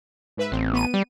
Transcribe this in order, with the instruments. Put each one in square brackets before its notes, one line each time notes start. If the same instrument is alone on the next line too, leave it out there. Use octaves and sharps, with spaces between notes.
[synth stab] G#2 B4 E5
[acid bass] A1 [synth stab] C4
[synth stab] B3 D#7
[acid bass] G3